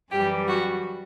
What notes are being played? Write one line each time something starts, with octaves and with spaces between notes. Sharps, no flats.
F#2 E3 G3 G4
F#4